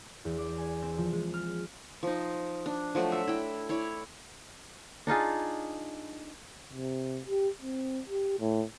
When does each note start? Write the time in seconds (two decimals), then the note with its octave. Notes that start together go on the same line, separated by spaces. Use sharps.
0.25 E2
0.38 D5
0.58 G#5
0.82 C4
0.98 F3
1.12 G#3
1.34 F6
2.03 F3 D#4
2.66 D4
2.95 F3 F#3 A3 F#4
3.12 E5
3.28 E4 G5
3.69 E4 C#5 D5
5.07 D4 D#4 F4 G#4
6.73 C3
7.27 G4
7.62 C4
8.09 G4
8.40 A2